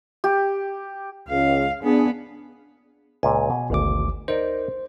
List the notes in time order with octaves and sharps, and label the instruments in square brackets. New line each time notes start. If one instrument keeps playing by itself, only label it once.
[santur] G4
[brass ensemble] C#2 [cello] F5
[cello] B3 [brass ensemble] D4 G#4
[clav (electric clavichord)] C#2 A#2 A5 [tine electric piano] G#5
[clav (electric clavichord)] B2
[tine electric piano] G#1 D2 D6
[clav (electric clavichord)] D#4 A#4 D5 [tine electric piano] C5